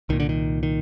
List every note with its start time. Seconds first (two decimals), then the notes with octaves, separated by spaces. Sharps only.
0.09 C2 A#2 D#3
0.20 D3
0.29 D#3
0.63 D#3